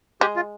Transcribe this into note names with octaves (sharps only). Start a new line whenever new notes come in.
G#3 G4
F4